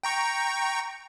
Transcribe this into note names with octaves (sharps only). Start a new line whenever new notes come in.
G5 A#5 C#6